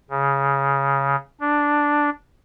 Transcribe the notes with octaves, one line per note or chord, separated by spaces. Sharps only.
C#3
D4